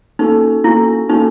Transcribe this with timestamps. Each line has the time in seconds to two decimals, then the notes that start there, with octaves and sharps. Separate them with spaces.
0.19 A#3 C#4 D#4 F#4 A4
0.64 A#3 C#4 E4 F#4 A4
1.09 A#3 C#4 D#4 F#4 A4